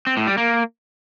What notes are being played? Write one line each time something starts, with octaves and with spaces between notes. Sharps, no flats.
C4
A2
G3
A#3